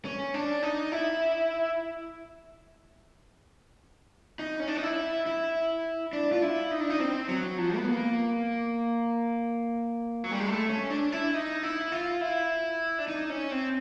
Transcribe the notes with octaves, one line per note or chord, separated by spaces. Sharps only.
C#4
D4
D#4
E4
D#4
C#4
D4
D#4
E4
E4
D4
F4
E4
D#4
D4
D#4
C4
F#3
F3
B3
A#3
F#3
G3
G#3
A3
C#4
D4
E4
D#4
E4
F4
E4
D4
D#4
C#4
C4